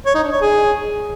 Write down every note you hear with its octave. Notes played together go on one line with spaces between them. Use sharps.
C#5
D#4
D4
C#5
G#4